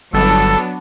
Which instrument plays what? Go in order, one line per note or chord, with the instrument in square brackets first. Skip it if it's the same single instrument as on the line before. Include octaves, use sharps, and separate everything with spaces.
[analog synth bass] G1 [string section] F#3 B3 D4 [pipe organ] A4